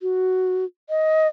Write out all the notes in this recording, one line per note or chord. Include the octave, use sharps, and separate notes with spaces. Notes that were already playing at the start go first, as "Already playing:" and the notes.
F#4
D#5